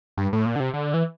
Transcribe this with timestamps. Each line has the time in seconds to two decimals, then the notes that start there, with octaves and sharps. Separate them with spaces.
0.18 G2
0.33 A2
0.46 A#2
0.56 D3
0.60 C3
0.74 D3
0.94 E3